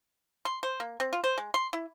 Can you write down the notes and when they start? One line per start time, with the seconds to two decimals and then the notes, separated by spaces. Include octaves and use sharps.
0.45 C6
0.63 C5
0.80 A#3
1.00 C4
1.13 F4
1.24 C5
1.38 G#3
1.54 C6
1.73 E4